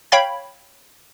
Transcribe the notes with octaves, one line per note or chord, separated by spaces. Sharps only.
C#5 F5 G5 B5 G#6